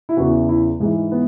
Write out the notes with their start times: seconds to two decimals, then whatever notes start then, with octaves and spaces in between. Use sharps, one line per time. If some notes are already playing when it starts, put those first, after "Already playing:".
0.09 E4
0.17 E2 C#3 E3 F#4
0.49 E4
0.80 G#2 E3 G#3
1.12 B3